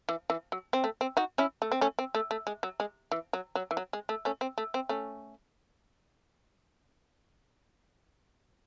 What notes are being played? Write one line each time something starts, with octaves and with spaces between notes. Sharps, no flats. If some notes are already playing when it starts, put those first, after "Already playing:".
E3
E3
F#3
C4
A3
C4
D#4 F#4
C#4 E4
A3
C4
A3 C#4
C4
A3
A3
G#3
F#3
G#3
E3
F#3
F#3
E3
F#3
G#3
A3
A3 C#4
C4
A3
C4
A3 C#4